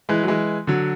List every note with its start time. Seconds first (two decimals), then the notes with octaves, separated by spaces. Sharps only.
0.09 E3 G#3
0.23 F#3
0.28 E3 G#3
0.67 D3 F#3